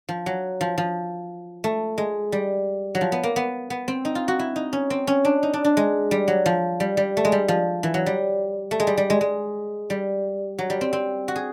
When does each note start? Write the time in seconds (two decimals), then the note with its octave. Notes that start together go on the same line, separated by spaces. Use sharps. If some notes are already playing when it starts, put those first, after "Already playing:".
0.09 F3
0.26 F#3
0.61 F3
0.78 F3
1.64 A3
1.98 G#3
2.32 G3
2.95 F#3
3.01 F3
3.12 B3
3.23 A#3
3.36 B3
3.70 B3
3.88 C4
4.05 D#4
4.15 F4
4.28 F#4
4.39 E4
4.56 D#4
4.73 C#4
4.90 C4
5.07 C#4
5.25 D4
5.43 D#4
5.53 D4
5.64 D4
5.77 G#3
6.11 G3
6.28 F#3
6.46 F3
6.80 G3
6.97 G3
7.17 A3
7.25 G#3
7.32 G3
7.48 F3
7.83 E3
7.94 F#3
8.06 G3
8.71 A3
8.80 G#3
8.87 G3
8.97 G3
9.10 G#3
9.21 G#3
9.90 G3
10.58 F#3
10.70 G3
10.81 C4
10.93 C4
11.28 F#4
11.36 G#4